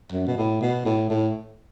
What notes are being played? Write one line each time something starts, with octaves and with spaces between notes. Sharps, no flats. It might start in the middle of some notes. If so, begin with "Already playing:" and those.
F#2
B2
A2
B2
A2
A2